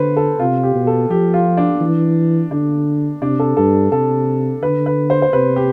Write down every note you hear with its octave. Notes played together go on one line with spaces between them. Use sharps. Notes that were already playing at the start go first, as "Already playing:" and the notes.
Already playing: D3 B4 C5
A4
C3 F4
G4
B2
A4
F3 G4
F4
D4
E3
D3 D4
C3 D4
A4
G2 A4
C3 A4
D3 B4
B4
C5
C5
C3 B4
G4